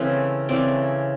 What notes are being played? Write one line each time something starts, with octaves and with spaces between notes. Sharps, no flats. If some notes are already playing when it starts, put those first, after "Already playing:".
Already playing: C#3 E3 A3 C4 B4
C#3 E3 A3 C4 D5